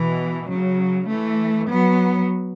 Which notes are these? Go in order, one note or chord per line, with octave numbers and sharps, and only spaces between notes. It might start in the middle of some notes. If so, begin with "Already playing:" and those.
Already playing: B2 E3
C#3 F#3
E3 A3
F#3 B3